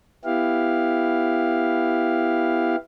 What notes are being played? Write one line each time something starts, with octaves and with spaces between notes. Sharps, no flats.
B3 E4 G4 F5